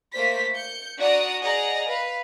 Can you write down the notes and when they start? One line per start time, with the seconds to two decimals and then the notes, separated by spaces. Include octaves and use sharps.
0.13 A3 A#3 C5 B6
0.55 G6 C#7
0.98 D4 F#4 D5 F#5 A#5 D#6
1.42 G#4 D5 D#5 F#5 G#5 A#5
1.88 B4 F5